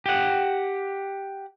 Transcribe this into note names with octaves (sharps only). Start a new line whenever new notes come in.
G4 F#5